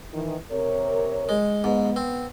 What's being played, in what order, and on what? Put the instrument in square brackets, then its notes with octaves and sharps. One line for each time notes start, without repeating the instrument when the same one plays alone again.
[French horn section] D#3 E3
C3 A#4 C#5
[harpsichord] G#3
[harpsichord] G#2 [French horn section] B3
[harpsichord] C4